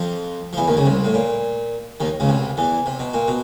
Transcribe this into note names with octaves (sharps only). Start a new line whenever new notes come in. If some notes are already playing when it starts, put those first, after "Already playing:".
Already playing: F2 F3
F3
E2 E3
D#2 D#3
C#2 C#3
C2 C3
A2
A#2
D#2 D#3
C#2 C#3
C2 C3
E2 E3
C3
B2
A#2
B2